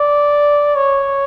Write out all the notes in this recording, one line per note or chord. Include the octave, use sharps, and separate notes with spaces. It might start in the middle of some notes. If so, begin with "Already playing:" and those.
Already playing: D5
C#5